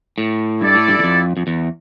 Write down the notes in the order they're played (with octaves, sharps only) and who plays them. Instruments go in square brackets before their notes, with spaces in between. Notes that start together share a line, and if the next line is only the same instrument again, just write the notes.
[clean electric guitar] A2
[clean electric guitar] G2 [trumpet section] E4 A4 D5
[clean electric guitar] A2
G2
E2
F2
F2
E2